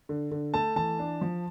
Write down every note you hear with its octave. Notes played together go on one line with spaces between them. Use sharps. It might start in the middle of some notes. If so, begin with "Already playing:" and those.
D3
D3
A3 A5
E3 A5
D4
F3